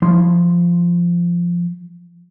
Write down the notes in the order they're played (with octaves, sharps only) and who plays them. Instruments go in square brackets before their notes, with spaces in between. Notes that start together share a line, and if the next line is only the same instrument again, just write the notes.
[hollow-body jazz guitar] F3 E4 C6